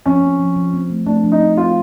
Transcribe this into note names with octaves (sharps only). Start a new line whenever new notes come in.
F3 C#4
C4
F3
F3
C4
A3
A3 D4
F3
D#4
C4
C4 F4